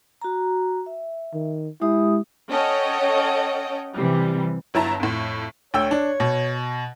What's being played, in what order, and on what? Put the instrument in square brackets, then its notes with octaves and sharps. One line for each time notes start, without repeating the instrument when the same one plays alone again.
[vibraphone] F#4 A#5
E5
[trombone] D#3
[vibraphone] G#3 G4 D#6 [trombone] E4
[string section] C#4 A4 C#5 D#5 F#5 G5
C3 E3 G3
[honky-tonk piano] G1 F#3 E4 A5 A#5
F2 A2
[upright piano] D2 G5 E6 [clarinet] C#5
[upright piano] D4
B2